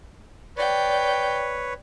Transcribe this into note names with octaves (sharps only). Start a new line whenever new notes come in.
B4 C#5 D5 G5